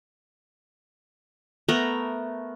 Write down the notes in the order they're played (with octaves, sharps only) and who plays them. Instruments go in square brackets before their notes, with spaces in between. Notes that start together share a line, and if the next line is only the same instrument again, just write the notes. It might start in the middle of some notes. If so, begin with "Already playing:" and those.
[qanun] A3 B3 A#4 A#5